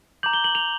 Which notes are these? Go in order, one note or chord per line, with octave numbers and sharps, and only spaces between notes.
A#5 D6 G6 F#7
G7
F#7
F7